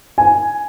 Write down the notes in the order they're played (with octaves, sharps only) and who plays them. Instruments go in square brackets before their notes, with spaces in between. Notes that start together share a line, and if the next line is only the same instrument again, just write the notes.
[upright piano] G#5